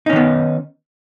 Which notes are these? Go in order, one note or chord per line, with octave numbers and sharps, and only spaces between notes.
D#3 B3 C#4 D#4